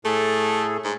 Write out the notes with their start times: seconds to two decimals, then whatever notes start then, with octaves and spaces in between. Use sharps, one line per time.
0.05 A2 A3 G#4 A4
0.84 G#2